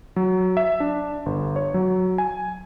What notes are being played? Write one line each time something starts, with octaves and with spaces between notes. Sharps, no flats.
F#3
E5
D4
G1
C#5
F#3
G#5